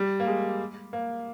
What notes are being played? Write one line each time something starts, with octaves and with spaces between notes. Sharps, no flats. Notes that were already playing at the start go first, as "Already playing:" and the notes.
Already playing: G3
A#3
G#3
A#3